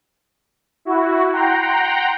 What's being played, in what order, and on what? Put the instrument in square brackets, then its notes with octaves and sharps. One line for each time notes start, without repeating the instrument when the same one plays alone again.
[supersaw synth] E4 F#4
F#5 G5 A#5 C6